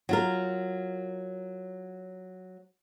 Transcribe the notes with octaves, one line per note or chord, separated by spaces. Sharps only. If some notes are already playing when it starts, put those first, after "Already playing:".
F#3 F4 A#4